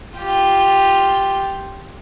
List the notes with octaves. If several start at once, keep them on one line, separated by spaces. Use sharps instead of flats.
F4 G4